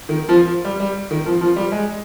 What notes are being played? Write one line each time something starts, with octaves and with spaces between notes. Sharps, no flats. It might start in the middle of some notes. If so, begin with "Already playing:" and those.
D#3
F3
G3
G3
D#3
F3
F3
G3
G#3